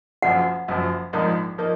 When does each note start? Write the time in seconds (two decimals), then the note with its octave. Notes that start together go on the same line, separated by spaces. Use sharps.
0.22 F#1 F#2 F3 F#5
0.68 F#1 F#2 F3
1.13 A#1 G#2 F3 A#3 D#4
1.58 F3 A#3 D#4